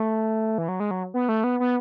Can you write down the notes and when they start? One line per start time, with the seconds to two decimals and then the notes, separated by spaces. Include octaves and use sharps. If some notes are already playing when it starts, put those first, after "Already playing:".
Already playing: A3
0.58 E3
0.69 F#3
0.80 G#3
0.91 F#3
1.14 B3
1.29 A3
1.44 B3
1.60 B3